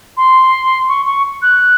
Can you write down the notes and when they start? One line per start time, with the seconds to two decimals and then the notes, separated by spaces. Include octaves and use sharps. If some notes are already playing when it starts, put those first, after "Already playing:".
0.17 C6
0.89 C#6
1.06 C#6
1.42 F#6